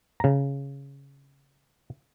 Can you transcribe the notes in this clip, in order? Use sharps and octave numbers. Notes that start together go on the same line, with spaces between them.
C#3 A#5